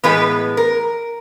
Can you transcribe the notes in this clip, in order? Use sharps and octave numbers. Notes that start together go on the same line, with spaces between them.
A2 E3 G#3 B3 B4
A#4